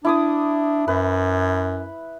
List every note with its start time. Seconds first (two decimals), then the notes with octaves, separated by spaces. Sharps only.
0.05 D4 E4 D6 D#6
0.88 F#2 B4